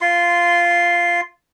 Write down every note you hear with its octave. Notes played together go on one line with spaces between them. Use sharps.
F4 C6